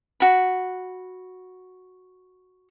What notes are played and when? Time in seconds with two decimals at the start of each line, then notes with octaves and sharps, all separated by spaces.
0.20 F#4 B5